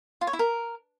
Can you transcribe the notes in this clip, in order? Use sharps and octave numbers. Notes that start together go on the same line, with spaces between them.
F4
C#5
E4
A#4